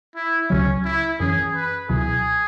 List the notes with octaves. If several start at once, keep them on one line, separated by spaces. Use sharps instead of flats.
E4
C#2 C#3 F#3 C#4
E4
F#2 E3 C#4 G#4
B4
C#2 B2 F#3 E4 G#4